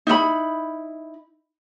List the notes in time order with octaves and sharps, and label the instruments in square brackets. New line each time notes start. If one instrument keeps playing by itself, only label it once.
[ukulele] D#4 E4 E5 B5